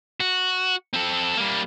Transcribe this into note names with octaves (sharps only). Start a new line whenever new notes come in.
F#4
C4 A4
G3 A#3